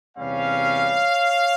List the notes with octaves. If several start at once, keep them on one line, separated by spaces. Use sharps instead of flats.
E2 C3 G3 C#4 C#5 F5